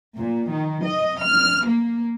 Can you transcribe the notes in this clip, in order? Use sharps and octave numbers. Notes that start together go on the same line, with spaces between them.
A#2
D#3
D#5
F6
A#3